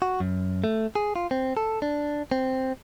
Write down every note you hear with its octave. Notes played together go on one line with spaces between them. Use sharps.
F#4
F#2
A3
G#4
F4
C4
A4
D4
C4